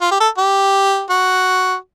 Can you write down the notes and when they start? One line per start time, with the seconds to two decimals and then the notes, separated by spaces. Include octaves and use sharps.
0.01 F4
0.11 G4
0.20 A4
0.38 G4
1.10 F#4